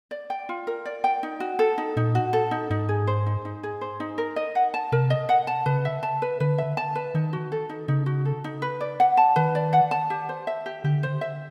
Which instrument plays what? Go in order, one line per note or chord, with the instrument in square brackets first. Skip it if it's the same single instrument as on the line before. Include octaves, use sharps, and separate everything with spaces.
[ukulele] D5
G5
F4
A#4
D5
G5
D#4
F#4
A4
D#4
[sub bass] A#2 [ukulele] D#4
[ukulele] F#4
A4
D#4
[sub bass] G#2 [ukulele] D#4
[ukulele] G#4
C5
D#4
D#4
G#4
C5
D#4
A#4
D#5
F#5
A5
[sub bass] C3 [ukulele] A#4
[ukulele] D#5
F#5
A5
[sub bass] C#3 [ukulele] B4
[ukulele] E5
A5
B4
[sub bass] D3 [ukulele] B4
[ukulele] E5
A5
B4
[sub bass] D#3 [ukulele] D#4
[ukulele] F#4
A4
D#4
[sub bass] C#3 [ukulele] D#4
[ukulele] F#4
A4
D#4
B4
D5
F#5
A5
[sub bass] D#3 [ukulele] B4
[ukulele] D5
F#5
A5
G4
C5
E5
G4
[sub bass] D3 [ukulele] G4
[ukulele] C5
E5